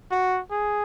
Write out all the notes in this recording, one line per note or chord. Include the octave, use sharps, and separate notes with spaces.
F#4
G#4